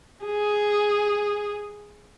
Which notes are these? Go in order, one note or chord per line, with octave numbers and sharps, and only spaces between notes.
G#4